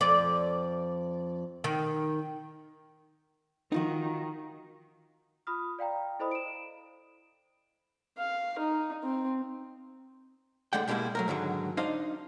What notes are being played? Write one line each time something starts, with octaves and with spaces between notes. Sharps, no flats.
F2 D5
D#3
D#3 D#4 F4 F#4
F4 B5 D#6 F6
D5 F5 G5 A#5
E4 A4 C5 D#5 B5 D#6
D7 E7
F5
D#4
C4
A2 D3 G#3 D5 F#5 G5
B2 G3 G#3 A#3 E4
F#3 A3 A#4
G#2 D3 D#3 F#3
D4 D#4 C5 D#5 F5